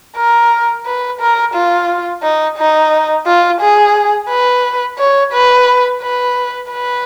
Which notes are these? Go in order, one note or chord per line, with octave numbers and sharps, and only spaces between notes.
A#4
B4
A#4
F4
D#4
D#4
F4
G#4
B4
C#5
B4
B4
B4